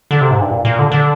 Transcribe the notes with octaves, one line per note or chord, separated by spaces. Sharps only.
D3
C3
G#2
G2
A#2
A#2
D3
D3